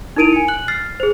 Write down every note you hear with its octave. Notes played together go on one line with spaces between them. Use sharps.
D#4 E4 A#4 D7 D#7 F7
G#5 C#7
F#6 F#7
F6 A6 C7
G#4 C5